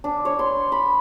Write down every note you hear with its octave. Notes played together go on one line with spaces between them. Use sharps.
D4
C#5
C6
B5